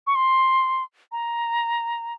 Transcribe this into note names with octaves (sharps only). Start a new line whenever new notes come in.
C#6
C6
A#5